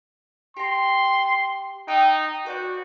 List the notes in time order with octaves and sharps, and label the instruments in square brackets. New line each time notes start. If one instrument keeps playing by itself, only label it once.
[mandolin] G4 A#5 [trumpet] C6
[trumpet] D#4 [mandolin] G5 E6 F#6
[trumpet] F#4 [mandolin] B4 D5 G6